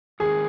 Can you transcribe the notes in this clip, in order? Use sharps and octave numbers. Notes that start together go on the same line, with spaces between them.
G#2 D#3 C#4 G#4 A#4